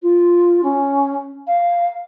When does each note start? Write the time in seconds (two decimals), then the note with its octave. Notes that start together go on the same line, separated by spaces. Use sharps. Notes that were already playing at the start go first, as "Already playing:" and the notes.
0.02 F4
0.63 C#4
1.47 F5